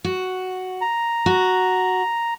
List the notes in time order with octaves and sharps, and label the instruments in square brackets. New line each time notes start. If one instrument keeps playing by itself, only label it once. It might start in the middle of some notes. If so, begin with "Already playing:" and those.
[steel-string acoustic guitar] F#4
[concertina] A#5
[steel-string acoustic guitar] F#4